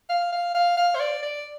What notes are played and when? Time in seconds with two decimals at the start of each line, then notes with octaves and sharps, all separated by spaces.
0.09 F5
0.32 F5
0.54 F5
0.77 F5
0.95 C5
1.00 D5
1.23 D5